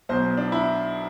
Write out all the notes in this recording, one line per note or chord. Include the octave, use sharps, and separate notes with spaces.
B1 B2 F#3 C5
D4
E4